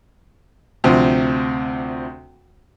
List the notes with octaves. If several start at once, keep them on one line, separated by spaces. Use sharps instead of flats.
D2 C3 F3 C4